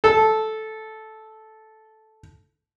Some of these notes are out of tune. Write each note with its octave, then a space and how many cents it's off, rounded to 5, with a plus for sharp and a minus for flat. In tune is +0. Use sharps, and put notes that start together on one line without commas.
A4 -10